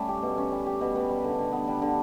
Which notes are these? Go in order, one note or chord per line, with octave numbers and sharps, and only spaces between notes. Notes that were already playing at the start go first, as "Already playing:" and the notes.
Already playing: G3 A3 C#4
G4
B2
C#4
G3
G4
B2
B3
G3
D3
D3
B3
G3
D3